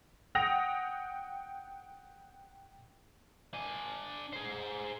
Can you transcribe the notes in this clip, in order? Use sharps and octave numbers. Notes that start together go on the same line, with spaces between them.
F#5 G5 D#6 A#6 F7
D4 G#5
G#4 C5